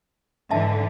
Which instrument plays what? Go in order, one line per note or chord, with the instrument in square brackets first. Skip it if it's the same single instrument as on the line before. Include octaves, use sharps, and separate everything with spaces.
[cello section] G#2 D3 E3 [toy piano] D#5 E5 A5